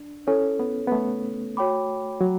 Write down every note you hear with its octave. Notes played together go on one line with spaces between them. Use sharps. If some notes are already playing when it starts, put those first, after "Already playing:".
Already playing: D4
C#4 E4 A4 C#5
B3
B3
A3
F#4 C#5 G5 B5 D6
F#3